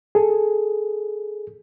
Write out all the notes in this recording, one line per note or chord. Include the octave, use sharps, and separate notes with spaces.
G#4 A4